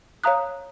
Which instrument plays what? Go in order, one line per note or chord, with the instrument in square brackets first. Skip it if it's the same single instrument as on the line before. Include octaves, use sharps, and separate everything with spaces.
[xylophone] C#5 F5 A#5 D#6 F#6